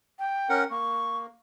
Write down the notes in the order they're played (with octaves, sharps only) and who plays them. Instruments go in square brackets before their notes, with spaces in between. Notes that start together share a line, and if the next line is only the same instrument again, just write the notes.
[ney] G5
[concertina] C#4 A#4 F#5
[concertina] A#3 [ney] C#6